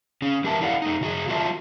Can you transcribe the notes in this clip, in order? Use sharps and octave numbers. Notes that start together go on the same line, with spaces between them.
C#3 C#4
E3 G4 A#4 E5 A5
E4 A4 D5 F5 F#5
A3 D#4
C#3 F#4 G#4
F#3 F4 F#4 A4 E5 A5